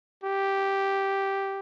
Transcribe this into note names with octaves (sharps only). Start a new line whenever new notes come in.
G4